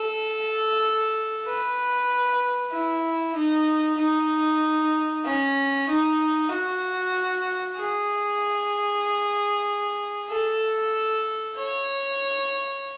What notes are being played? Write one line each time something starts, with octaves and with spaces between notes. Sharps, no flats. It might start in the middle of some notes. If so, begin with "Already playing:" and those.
Already playing: A4
B4
E4
D#4
D#4
C#4
D#4
F#4
G#4
A4
C#5